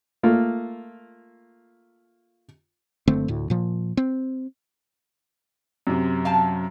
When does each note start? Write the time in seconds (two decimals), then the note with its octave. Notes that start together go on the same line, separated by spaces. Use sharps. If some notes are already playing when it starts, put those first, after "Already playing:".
0.23 A3 A#3 F4
3.08 F#1 D3 A3 C4
3.28 D2 A2
3.50 A#2 F3
3.97 C4
5.87 F#2 C3
6.25 F5 G5 A5